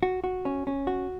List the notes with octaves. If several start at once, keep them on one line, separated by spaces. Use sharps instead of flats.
F#4
F#4
C#4
C#4
F#4